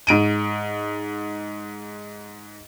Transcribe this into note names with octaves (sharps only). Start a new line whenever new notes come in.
G#2 D7 D#7